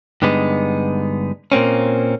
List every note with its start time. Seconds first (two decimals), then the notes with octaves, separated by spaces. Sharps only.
0.22 G2 D3 G#3 B3 D#4
1.52 A#2 A#3 C4 C#4